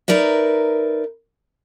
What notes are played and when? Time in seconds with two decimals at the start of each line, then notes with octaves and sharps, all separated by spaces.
0.08 D#4 A#4 B4 D5 E5